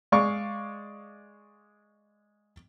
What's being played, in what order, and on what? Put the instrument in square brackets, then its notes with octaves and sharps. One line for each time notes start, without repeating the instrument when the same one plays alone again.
[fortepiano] G#3 D5 F5 C#6